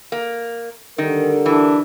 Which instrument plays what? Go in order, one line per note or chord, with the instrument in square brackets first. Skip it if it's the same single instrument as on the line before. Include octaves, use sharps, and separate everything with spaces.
[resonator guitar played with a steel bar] A#3
[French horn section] D3 G3 A#4 [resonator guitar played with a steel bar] D#3
[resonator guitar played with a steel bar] E3 [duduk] D4